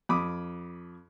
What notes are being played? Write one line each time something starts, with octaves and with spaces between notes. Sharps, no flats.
F2 B5 D6 D#6